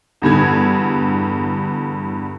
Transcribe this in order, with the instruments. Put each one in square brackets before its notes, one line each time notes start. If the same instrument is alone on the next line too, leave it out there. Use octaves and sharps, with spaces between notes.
[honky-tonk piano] E2 G2 D3 G#6